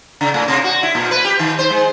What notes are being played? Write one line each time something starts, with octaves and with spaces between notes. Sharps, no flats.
C#3
A2
C3
F#4
E4
A#2
B4
G4
D#3
C5
G#3